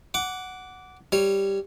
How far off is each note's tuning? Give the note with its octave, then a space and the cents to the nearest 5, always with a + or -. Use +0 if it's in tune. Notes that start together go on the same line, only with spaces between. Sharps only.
F#5 +0 D6 -20
G3 +0 C#5 +0